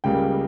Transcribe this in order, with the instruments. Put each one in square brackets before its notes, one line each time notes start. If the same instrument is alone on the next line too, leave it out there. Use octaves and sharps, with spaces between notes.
[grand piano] C#2 C#3 G3 A#3 G5